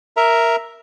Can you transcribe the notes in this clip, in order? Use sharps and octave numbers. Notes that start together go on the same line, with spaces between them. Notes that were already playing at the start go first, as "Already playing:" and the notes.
A#4 E5 A#5